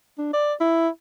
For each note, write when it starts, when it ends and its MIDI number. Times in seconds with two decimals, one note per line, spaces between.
0.18 0.28 62
0.33 0.54 74
0.60 0.88 64